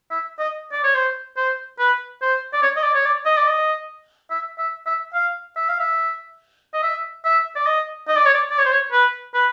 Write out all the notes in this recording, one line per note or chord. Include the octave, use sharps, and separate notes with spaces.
E5
D#5
D5
C#5
C5
C5
B4
C5
D5
C#5
D#5
D5
C#5
D5
D#5
D5
D#5
E5
E5
E5
F5
E5
F5
E5
D#5
E5
E5
D5
D#5
D#5
D5
C#5
D5
D5
C#5
C5
C#5
B4
B4